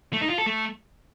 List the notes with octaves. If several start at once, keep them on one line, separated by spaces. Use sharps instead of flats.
A3
D#4
F4
A4
A3